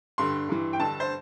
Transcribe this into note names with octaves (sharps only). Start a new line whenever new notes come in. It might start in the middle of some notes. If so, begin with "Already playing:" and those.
G2 D3 C6
G2 E3
G5
G2 D3 A5
C5